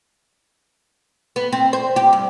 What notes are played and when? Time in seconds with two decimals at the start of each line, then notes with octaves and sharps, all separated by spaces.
1.36 B3
1.53 C4
1.73 C5
1.96 G4
2.13 G2